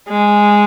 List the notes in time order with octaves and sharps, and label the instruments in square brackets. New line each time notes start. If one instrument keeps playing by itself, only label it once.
[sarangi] G#3